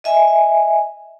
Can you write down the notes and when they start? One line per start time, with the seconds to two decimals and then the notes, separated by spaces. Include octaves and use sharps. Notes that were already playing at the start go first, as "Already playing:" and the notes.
0.04 D#5 E5 G#5